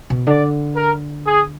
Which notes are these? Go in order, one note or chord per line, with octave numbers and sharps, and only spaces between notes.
B2
D3 D5
A#4
G#4